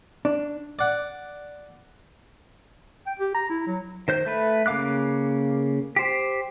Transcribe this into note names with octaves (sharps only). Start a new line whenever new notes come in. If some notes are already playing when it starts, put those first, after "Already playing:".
D4
D5 F#5
G5
G4
A#5
E4
F#3
D#3 C5 G6
A3 B4
C#3 A#3 F5 D6 F#6
G4 C5